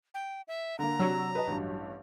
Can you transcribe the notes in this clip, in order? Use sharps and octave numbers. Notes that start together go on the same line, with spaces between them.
G5
E5
D3 A#3 A#5
C3 F#3 D4 E6
B4 D#5 A5
A1 G2